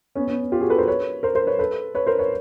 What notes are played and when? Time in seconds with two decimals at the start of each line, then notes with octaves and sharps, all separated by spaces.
0.15 B3 C#4
0.28 B3 C#4
0.52 F4 G4
0.60 F#4 G#4
0.70 A4 B4
0.78 A#4 C5
0.88 B4 C#5
1.23 A#4 C5
1.35 A#4 C5
1.47 B4 C#5
1.59 A4 B4
1.95 B4 C#5
2.07 A#4 C5
2.19 B4 C#5